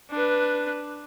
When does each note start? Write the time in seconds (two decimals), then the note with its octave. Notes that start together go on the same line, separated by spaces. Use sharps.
0.11 D4 B4